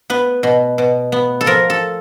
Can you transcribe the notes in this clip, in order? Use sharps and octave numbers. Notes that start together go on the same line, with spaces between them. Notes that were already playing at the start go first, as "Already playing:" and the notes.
B3 B4
B2
B2
B3
A4
F3 A#4
A4